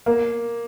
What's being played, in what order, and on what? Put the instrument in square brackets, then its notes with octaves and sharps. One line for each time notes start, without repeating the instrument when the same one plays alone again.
[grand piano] A#3